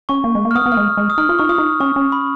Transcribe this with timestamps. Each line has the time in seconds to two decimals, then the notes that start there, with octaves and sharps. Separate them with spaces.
0.09 C#4 C#6
0.24 A#3
0.35 G#3
0.45 A#3
0.51 F6
0.55 B3 D#6
0.66 B3
0.72 A#3 F6
0.77 G#3
0.97 G#3
1.10 D#6
1.18 D#4 F6
1.29 F4
1.39 D#4 C#6
1.49 F4 D#6
1.58 D#4
1.80 C#4 C#6
1.96 C#4
2.12 B5